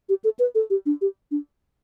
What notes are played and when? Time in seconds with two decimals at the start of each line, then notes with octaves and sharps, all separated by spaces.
0.09 G4
0.24 A4
0.39 B4
0.55 A4
0.70 G4
0.86 D4
1.01 G4
1.31 D4